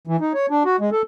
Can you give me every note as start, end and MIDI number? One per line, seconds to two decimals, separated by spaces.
0.07 0.16 52
0.20 0.33 63
0.34 0.46 73
0.50 0.63 62
0.65 0.76 66
0.80 0.90 56
0.92 1.02 69